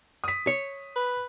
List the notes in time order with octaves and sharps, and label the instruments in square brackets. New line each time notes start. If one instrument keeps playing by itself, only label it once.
[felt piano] D#6 B6
[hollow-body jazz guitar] C#5
[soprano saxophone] B4